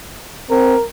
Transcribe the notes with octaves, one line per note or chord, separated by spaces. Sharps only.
C4 A#4